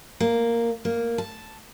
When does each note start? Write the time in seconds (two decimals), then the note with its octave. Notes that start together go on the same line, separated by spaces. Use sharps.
0.20 A#3
0.85 A#3
1.18 A5